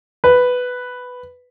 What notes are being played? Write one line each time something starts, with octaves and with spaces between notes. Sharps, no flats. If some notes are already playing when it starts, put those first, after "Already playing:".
B4